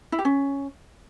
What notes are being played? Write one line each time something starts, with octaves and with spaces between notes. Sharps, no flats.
E4
G4
C#4